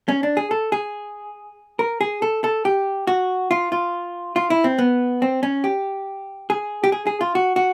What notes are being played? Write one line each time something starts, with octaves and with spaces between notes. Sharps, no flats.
C#4
D4
G#4
A4
G#4
A#4
G#4
A4
A4
G4
F#4
F4
F4
F4
E4
C4
B3
C4
C#4
G4
G#4
G4
G#4
G#4
F4
F#4
F#4